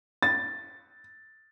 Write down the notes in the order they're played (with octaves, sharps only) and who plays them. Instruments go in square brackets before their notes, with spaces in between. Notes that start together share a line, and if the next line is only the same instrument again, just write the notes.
[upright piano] A6